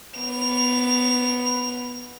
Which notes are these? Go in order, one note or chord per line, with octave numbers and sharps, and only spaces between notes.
B3 F7